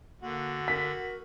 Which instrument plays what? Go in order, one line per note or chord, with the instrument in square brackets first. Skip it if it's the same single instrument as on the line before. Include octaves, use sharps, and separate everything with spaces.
[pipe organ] D3 [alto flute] A#3 [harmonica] F#4
[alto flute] A#4 [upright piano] B6